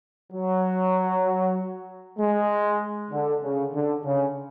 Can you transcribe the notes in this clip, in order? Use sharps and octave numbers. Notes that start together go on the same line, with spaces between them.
F#3
G#3
D3
C#3
D3
C#3